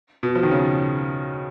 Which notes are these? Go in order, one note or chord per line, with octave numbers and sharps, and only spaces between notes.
B2
F3
D#3
C#3